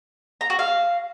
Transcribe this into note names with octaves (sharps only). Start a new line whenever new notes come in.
A#5
F#4
F5